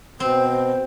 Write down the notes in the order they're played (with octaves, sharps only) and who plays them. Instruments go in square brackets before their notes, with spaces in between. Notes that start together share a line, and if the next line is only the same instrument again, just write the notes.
[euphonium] B2 [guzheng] C4 [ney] C5